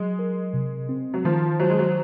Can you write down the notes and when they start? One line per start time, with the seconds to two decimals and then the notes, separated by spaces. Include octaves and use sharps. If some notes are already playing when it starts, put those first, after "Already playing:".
Already playing: F#3 G#3
0.19 A#4
0.53 C3
0.89 C4
1.14 F#3
1.25 D#3 F3
1.60 F#3 C5
1.70 G#3
1.79 F#3